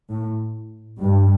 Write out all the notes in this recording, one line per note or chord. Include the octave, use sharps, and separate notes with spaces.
A2
G2